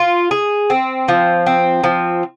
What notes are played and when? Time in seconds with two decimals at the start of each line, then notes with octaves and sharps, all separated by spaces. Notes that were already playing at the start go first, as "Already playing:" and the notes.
Already playing: F4
0.31 G#4
0.70 C4
1.08 F3
1.46 C4
1.84 F3